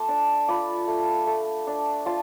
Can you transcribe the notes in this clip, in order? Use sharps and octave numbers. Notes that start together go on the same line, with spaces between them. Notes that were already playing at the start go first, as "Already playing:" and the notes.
Already playing: A3 A5 C6 D6
D4
F4 B5 D6
A3
A3
D4
F4 A5 C6